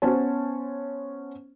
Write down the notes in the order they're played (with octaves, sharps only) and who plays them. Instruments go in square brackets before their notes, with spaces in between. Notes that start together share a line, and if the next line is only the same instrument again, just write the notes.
[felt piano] B3 C#4 C5 C#5 A5